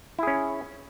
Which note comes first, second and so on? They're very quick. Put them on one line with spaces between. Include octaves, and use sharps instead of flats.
E4 G#4 C#4